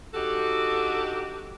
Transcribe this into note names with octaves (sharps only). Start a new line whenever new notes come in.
D4 D#4 F#4 G4 A4